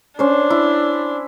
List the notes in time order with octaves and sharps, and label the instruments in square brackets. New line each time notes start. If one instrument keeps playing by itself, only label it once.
[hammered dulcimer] C#4 C5 [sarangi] D4
[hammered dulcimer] E4